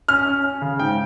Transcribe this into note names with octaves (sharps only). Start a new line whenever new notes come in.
C#4 F6
C#4
C#4
C#3
G#2 G5